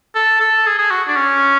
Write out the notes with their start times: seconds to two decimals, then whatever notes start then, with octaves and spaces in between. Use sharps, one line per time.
0.15 A4
0.40 A4
0.66 G#4
0.79 G#4
0.91 F#4
1.08 D4
1.16 C#4